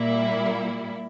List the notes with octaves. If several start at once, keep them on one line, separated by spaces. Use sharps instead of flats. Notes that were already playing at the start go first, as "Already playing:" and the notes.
Already playing: A#2 G3 A#3 E4